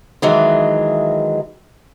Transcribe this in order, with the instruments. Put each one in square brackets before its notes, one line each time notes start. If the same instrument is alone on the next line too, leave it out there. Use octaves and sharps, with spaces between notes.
[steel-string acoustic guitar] D#3 E3 F#3 G#3